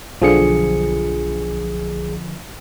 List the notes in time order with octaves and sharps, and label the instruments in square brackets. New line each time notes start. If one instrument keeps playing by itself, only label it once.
[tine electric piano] B1 G#4 C#7 [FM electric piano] D3 F3